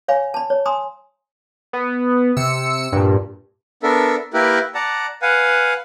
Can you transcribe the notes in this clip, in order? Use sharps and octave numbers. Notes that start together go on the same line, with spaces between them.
C#5 F5 G#5 B5
A5 B5
C#5
G#5 A#5 C6 D#6
B3
C3 E6 C#7
G2 A#2
B3 D4 A4 A#4 E5
A#3 E4 G4 A#4 B4
D5 F#5 A5 A#5
B4 F5 F#5 G#5